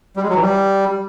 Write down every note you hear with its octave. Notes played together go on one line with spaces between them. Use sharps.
G3
G#3
F#3
E3
G3